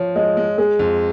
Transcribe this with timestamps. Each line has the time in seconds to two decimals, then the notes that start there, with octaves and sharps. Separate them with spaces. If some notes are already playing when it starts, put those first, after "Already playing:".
Already playing: F3 C#5
0.16 G#3 D#5
0.37 G#3
0.58 G#3 G#4
0.79 F2